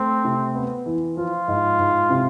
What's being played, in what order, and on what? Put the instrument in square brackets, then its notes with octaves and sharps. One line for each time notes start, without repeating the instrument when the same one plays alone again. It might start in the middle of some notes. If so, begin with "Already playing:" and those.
Already playing: [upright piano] A3 [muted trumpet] C4
[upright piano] C3
B3
E3
[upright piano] F3 [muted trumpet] F4
[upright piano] G#2
G#2
C3